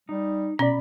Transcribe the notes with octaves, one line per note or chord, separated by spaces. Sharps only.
G3 D#4
B2 C#4 D5 B5